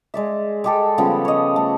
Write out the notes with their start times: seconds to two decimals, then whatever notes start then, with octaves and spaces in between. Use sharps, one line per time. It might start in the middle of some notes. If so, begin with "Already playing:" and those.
0.14 G#3 D5 E5
0.64 G#3 G4 A4
0.98 C#3 F3 G3 B3
1.25 C#5 D#5
1.56 A3